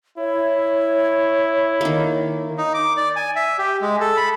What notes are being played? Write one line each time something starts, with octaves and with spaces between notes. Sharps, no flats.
E4 C#5
D#3 A#3
D#4
D6
D5
G#5
E5
G4
G#3
A4
B5